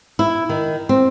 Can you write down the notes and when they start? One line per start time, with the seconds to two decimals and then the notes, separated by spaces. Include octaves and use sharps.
0.19 E4
0.49 D#3
0.89 C4